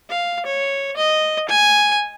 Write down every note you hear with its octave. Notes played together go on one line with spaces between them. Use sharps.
F5
C#5
D#5
G#5